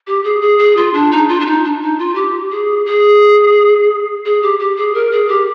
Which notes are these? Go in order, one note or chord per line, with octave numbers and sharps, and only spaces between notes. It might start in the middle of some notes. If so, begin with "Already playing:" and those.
G4
G#4
G#4
G#4
F4
D4
D#4
F4
D4
D#4
D4
D#4
F4
G4
G#4
G#4
G#4
G4
G4
G#4
A#4
G#4
G4